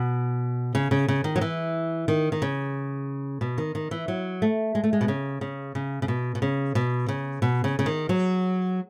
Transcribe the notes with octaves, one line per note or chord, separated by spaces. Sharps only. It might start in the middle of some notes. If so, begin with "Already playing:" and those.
Already playing: B2
C#3
C#3
C#3
D#3
F#3
E3
D#3
D#3
C#3
B2
D#3
D#3
E3
F#3
A3
G#3
A3
G#3
B2
C#3
C#3
C#3
C#3
B2
B2
C#3
B2
C#3
B2
C#3
C#3
D#3
F#3